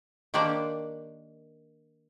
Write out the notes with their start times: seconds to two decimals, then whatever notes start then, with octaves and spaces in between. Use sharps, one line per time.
0.34 D#3 A#3 D4 G4 C5 D5